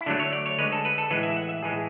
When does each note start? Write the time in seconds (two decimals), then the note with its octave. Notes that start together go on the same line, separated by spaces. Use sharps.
0.01 E4
0.06 D3 F#3 A3 D4
0.20 C#5
0.33 D5
0.46 C#5
0.58 D3 G#3 B4
0.72 A4
0.85 B4
0.98 A4
1.11 A2 E3 G#3 B4
1.23 E5
1.36 F#5
1.49 E5
1.63 A2 E3 G#3 G#4